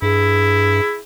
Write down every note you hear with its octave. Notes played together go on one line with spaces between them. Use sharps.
G2 E4 G#4